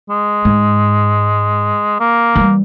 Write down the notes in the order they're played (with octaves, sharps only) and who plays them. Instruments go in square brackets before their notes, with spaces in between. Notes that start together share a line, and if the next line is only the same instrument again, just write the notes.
[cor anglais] G#3
[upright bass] G#2
[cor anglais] A#3
[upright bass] E3 G3